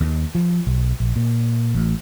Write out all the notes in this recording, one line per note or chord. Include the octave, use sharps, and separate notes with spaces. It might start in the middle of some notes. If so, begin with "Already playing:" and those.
D#2
F3
B1
A#1
A#2
A1